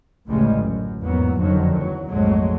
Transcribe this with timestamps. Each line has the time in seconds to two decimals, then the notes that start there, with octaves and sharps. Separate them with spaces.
0.25 A1 D2 A2 C#3 G3 G#3
0.55 F#2
1.00 E2 G#2 F#3 A#3 B3
1.38 F#1 F2 D3 D#3 F3 F#3
1.74 E2 F#3
2.08 A#1 F2 G#2 F#3 G#3 A3